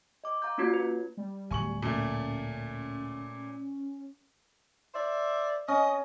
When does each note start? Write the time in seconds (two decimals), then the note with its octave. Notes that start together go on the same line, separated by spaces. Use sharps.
0.24 D#5 D6
0.42 F5 A#5 D6 G6
0.58 A#3 C#4 F4 F#4 C#5 G#6
0.74 F4 B4
1.17 G3
1.51 D1 G#5 C#6 F#7
1.82 A#2 A3 C#4
4.94 C5 D5 E5
5.68 C#4 D#5